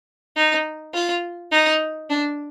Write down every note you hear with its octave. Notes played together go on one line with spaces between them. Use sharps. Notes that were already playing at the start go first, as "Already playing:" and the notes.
D#4
F4
D#4
D4